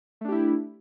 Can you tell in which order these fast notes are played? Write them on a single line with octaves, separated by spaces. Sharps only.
A3 D4 G4 E4